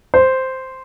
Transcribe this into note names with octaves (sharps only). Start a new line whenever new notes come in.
C5